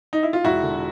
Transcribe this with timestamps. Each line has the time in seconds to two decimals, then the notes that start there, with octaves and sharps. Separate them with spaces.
0.13 D#4
0.23 E4
0.33 F4
0.45 E1 E4 F#4
0.63 D3